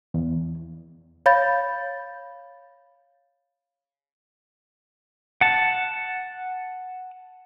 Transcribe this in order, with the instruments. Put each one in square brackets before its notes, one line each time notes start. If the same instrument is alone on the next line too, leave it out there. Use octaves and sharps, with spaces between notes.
[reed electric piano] E2
[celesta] C#5 F5 B5 G6 A6
[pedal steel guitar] F#5 A5